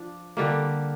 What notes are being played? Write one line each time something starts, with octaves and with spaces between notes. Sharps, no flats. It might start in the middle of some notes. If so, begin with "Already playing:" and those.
Already playing: F3 D4
D3 G3 A#3